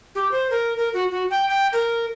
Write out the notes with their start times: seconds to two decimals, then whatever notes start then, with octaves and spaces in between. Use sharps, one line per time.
0.15 G4
0.31 C5
0.51 A#4
0.78 A#4
0.94 F#4
1.11 F#4
1.30 G5
1.49 G5
1.73 A#4